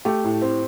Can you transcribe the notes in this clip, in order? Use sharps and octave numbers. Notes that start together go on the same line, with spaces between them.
A3 G4
A2
C4